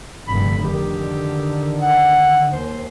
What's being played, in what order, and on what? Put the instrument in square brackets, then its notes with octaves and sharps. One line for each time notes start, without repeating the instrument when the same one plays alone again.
[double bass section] F1 G2 D3 [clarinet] B5
[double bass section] D3 D#3 [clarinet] G4
[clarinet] F#5
[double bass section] D#2 [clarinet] C5